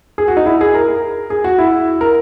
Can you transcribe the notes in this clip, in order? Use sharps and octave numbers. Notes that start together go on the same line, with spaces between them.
G#4
F#4
D#4
E4
G#4
A#4
G#4
F#4
E4
A#4